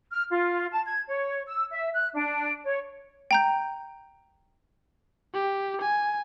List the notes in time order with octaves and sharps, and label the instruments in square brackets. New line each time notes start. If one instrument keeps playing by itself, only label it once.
[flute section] F6
F4
A5
G#6
C#5
E6
E5
F#6
D4
C#5
[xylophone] G5 A#5 G6
[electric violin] G4
G#5